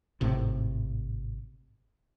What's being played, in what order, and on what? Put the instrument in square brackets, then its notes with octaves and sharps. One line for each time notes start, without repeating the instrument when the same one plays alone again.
[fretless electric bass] G#1 A2 C3